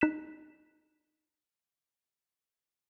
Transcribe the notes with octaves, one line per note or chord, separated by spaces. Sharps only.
D#4 F#6 B6 E7